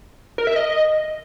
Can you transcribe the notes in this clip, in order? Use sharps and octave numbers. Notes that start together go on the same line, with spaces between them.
A#4
E5
D#5